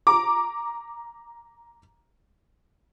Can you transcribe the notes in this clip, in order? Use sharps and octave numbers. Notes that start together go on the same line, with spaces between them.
A#5 D6